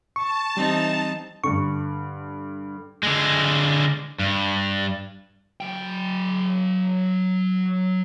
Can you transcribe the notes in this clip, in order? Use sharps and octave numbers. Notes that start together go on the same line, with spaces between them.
A5 C#6
E3 G3 C4 D#4
G2 D3 C#6
D3 G#3
G2
F#3 G5